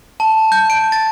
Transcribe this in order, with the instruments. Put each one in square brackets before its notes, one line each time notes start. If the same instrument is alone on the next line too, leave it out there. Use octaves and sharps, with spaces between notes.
[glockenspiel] A5
G6
D7
A6